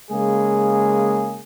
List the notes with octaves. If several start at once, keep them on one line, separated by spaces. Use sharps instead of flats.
C#3 G#3 A#3 G#4